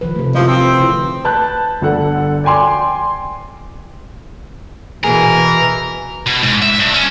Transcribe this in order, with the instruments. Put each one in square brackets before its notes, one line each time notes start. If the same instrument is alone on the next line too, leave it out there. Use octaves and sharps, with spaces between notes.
[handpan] D#3 F3 B4
C3 A3
[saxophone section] F#2 C3 F3 [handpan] E4 F4 D#5
[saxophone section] C4
[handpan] C#3 E4 B4
[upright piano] B4 A5 F#6 G6
G1 D3 A4 F#5
D5 G5 G#5 C6 D6
[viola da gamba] B2 [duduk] E3 [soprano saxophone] G#4 [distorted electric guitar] A#4
[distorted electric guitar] B2
G#2
E5
G2
C#4